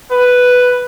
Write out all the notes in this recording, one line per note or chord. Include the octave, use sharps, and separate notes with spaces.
B4